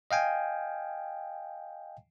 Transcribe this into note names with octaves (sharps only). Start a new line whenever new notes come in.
D#5 F5 G5 G#5